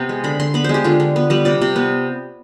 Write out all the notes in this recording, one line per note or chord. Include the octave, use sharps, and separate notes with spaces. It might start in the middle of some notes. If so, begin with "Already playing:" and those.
Already playing: C3 B3
G#3
D3 B5
D3 C6
B3 B5
G#3 C5
G4
D3 F4
D3
B3
G3 B4
C3 D5
C3
B3